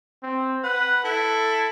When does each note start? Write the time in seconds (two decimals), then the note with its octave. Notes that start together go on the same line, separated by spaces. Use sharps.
0.23 C4
0.64 B4 F#5
1.04 E4 A4